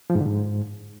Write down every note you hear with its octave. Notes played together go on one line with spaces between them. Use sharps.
F3
G#2
D3
G#2